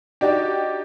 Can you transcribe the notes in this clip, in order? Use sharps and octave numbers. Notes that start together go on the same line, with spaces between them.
D4 D#4 F#4 G4 D5